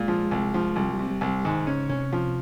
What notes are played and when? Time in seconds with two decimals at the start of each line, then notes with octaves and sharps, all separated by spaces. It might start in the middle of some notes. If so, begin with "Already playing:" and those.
Already playing: A#2 G#3
0.08 F3
0.31 C2
0.54 F3
0.76 C2 G3
0.93 G3
0.99 C3
1.11 G3
1.21 C2
1.27 G3
1.44 G#2 D#3
1.67 C#3 C#4
1.89 C3 C#4
2.13 F3